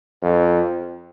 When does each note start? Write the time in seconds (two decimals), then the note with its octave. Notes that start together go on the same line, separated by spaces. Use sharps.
0.22 F2